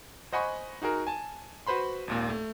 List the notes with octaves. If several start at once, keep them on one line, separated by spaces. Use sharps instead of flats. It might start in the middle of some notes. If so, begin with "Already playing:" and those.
C5 D#5 F#5 G#5 B5 C#6
D#4 F#4 G#4 A#4
G#5 A5
F#4 B4 C5 B5 C6
G#1 D#2 A#2
A3